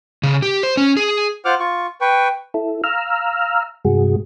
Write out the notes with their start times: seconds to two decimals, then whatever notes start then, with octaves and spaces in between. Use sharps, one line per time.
0.23 C#3
0.42 G4
0.63 C5
0.77 C#4
0.97 G#4
1.45 F4 C5 F#5 D6 F6
1.60 F4 C#6
2.01 B4 G5 C#6
2.54 E4 A4
2.84 F5 A#5 E6 F6
3.85 G2 C3 G#3 F#4 G#4